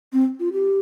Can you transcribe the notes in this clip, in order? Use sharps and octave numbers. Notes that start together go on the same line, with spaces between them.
C4
F4
G4